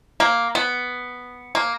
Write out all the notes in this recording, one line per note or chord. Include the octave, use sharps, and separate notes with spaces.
A#3
B3
A#3